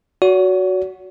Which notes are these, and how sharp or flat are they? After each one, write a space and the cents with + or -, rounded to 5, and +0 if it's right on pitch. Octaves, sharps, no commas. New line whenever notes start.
F#4 +0 C#5 +45